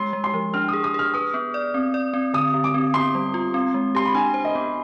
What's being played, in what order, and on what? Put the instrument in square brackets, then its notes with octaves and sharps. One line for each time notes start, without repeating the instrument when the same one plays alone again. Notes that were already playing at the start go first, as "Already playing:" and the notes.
Already playing: [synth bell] G#3 [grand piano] C6
[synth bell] G#3
[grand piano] C6
[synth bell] F3
[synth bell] D4 [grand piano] F6
[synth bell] G#4 [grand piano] D#6
[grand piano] D#6
[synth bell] G#4 [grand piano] F6
[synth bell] B4 [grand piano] D#6
[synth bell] B3
D5
C4
D5
C4
[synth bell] D3 [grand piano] D#6
[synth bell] D3
[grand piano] D6
[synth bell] C4
[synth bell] B3 [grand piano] C6
[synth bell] G3
F4
C4
G#3
[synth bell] G4 [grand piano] C6
[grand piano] B5
[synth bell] D4 [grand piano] G#5
[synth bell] C5
[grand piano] D#5
[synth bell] B3